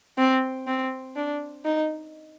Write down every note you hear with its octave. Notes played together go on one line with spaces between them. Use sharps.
C4
C4
D4
D#4